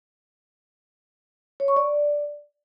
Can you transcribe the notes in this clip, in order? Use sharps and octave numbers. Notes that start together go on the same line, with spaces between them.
C#5
C#6
D5